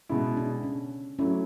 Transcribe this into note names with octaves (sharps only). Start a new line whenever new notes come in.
B2 G#3 B3 C#4 E4
D4
C#4
F#3 A3 C#4 E4